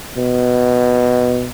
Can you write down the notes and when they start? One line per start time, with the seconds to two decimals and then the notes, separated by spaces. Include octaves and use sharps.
0.17 B2